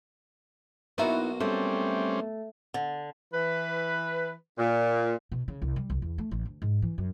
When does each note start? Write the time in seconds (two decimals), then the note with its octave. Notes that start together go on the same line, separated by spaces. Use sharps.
0.98 B1 A#3 B3 D#4 E4 F#4
1.40 G3 A3 C4 C#4
2.74 D3
3.33 E3 B4
4.58 A#2
5.32 B2
5.48 C#3
5.62 C2
5.76 G3
5.90 C2
6.02 E2
6.18 A3
6.31 A1
6.45 D2
6.62 G#2
6.82 E3
6.98 F#2